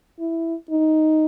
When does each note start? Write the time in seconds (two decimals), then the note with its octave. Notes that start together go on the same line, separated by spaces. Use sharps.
0.19 E4
0.71 D#4